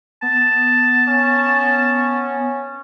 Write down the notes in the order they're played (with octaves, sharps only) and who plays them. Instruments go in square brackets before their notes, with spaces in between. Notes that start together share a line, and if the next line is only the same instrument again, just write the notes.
[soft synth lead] B3 [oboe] A5
[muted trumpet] C#4